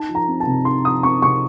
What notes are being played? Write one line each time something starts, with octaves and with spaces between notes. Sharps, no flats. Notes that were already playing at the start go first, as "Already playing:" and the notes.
Already playing: D#4 A5
F3
A#5
C4
A5
C3
D#4 C6
F3 D#6
C4 C#6
C3 C#6